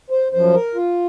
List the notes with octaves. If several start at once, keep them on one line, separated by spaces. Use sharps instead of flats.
C5
F#2 F3 C5
A#4
F4